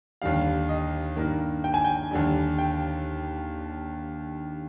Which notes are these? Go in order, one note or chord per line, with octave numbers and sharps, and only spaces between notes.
D#2 D3 G3 F5
D#5
G2 D#3 A#3
G5
G#5
G5
D#2 D3 G3
G5